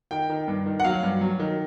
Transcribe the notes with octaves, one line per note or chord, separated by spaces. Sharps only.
D#3 G5
D#3
G2
D#3
F#5
F#3 F5
G2
F#3
D#3